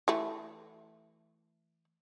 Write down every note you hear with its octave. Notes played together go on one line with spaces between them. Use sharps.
E3 A3